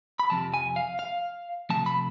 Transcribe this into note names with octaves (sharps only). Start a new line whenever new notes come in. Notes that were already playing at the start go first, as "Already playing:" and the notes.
B5
F2 C3 F3 A5
G#5
F5
F5
C3 F3 A3 A5
B5